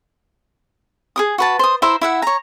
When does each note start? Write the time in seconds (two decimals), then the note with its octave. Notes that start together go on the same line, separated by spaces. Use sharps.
1.16 G#4 A#4 D#6
1.38 F#4 B4 A5
1.59 C5 D#6
1.82 E4 C5 E5 A#5
2.01 E4 E5 F#5
2.22 C#5 A#5